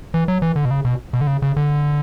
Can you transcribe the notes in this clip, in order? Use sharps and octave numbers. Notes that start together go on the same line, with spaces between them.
E3
F#3
E3
D3
B2
C#3
B2
B2
D3
C#3
C#3
D3